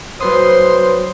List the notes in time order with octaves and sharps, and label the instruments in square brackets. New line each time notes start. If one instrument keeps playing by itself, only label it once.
[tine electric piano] F#3 B4 D#6 [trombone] C5 [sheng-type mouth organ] C6